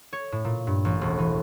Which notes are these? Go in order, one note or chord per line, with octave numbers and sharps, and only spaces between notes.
C#5
A2
A#2
G2
A1
E1
E3